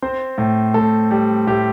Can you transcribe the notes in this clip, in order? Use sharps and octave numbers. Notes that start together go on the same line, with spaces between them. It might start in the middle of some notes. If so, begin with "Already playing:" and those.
C4 C5
A2
A2 A4
G3
A2 G4